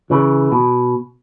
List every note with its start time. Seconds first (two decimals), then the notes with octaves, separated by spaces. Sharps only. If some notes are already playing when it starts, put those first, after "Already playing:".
0.10 C#3 E3
0.52 B2